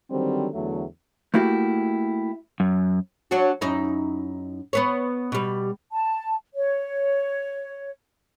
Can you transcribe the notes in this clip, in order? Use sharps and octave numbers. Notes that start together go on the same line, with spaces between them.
D3 D#3 F#3 G3 C4
E2 D3 F#3 A3
A3 A#3 E4 F#4 G4
F#2
F#3 D4 F#4
F#2 D#4 E4
B3 B4 C#5
B2 G3
A5
C#5